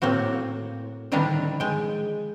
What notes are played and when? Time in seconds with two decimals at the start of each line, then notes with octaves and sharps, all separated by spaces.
0.02 A2 A#3 C4 F#4
1.12 D3 D#3 F3 G3 D4 E4
1.60 G#3 G5